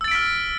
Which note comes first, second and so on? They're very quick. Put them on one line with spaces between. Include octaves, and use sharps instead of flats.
E6 A6 D7 B6 F6